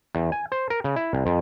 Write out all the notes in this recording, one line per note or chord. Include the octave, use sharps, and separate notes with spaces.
E2
G#5
C5
A#4
C#3
E4
C2
F2